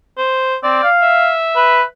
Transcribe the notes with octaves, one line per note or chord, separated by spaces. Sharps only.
C5
C4 D5
F5
E5
B4